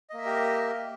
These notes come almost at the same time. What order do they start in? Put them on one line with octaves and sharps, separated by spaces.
D#5 A#3 E5 A#4 G4